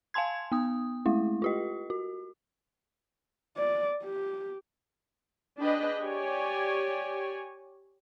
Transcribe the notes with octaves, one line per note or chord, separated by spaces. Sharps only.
F5 G#5 A5 C6 G#6
B3 D#6
G#3 A3 E4
F4 G4 D#5
F#4
D5
G4
D4 G#4 B4 D#5 G5 B5
G4 C#5 D5 G#5